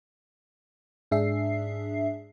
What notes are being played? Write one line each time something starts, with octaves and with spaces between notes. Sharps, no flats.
G#2 D4 G#4 E5 C7